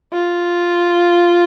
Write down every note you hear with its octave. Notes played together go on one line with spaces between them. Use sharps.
F4